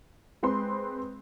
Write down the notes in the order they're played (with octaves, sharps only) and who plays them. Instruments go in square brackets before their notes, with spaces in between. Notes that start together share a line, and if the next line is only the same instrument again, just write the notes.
[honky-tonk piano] G#3 C4 B4 C6